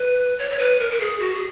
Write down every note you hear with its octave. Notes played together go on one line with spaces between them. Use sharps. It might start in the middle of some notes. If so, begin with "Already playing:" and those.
Already playing: B4
C#5
C#5
B4
A#4
A#4
G#4
F#4
G#4